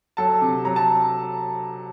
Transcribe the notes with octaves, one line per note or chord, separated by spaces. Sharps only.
F#3 A4 A5
C3
F#3 A#5
A5